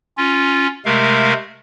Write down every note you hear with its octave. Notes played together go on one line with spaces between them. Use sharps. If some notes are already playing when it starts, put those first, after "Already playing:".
C#4 F4
C3 G#3 A3 A#4 F5